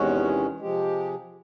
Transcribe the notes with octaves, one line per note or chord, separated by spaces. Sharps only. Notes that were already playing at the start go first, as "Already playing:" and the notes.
Already playing: E2 C3 D#3 G#3 C#4 F#4
C3 F3 G#3 G4